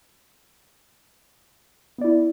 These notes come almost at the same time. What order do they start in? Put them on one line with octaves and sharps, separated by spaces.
B3 D5 E4